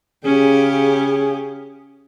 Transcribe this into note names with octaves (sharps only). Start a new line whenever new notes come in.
C#3 C#4 G4 G#4